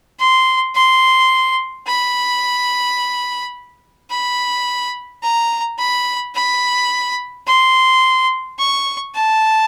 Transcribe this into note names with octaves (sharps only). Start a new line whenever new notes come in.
C6
C6
B5
B5
A#5
B5
B5
C6
C#6
A5